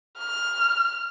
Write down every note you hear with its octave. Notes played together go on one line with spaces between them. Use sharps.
F6